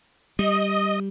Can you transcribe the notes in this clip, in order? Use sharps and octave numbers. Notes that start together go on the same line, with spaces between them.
G3 D#5